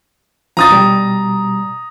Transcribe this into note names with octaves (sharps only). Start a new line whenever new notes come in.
F3 C#4 F4 A#5 D#6 A6
B2 G3